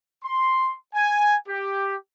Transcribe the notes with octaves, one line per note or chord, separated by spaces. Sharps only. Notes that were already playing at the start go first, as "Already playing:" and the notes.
C6
G#5
G4